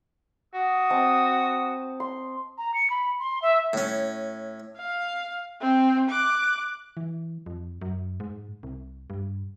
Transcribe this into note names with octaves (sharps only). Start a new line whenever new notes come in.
F#4 D#6
C4 D#5 A5
C6
A#5
C#7
B5
C6
E5
A2 C#4
F5
C4
D6 F#6
E3
F2
F#2
G#2
C2
G2